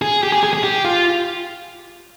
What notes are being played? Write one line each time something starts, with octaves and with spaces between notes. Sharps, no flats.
G#4
G4
G#4
G#4
G#4
G4
F4